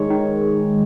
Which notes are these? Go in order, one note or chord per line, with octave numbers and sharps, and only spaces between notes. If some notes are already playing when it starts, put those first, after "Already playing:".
Already playing: D#3 G#3 C#5
D#3